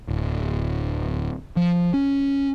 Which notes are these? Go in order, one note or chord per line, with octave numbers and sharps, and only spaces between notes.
D1
F3
C#4